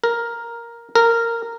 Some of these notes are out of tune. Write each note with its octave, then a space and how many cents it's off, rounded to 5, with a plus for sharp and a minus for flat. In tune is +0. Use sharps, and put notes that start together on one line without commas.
A#4 +5
A#4 -10